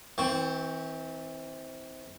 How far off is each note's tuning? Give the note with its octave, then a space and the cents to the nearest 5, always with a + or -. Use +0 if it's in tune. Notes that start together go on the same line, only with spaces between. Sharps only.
E3 -35 C4 +0 C#6 +0